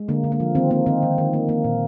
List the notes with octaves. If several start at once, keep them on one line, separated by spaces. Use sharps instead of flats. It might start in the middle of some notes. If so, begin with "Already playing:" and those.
Already playing: G#3
D3 A#3
D3
A#3
F3
D#3 C4
A#3 C4
D#3 C4 D#4
D#3
D#3
A#3
A#3
A#2